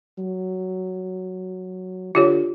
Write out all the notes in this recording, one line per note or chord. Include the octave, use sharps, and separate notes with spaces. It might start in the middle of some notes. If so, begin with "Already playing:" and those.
F#3
D3 F4 G4 C#5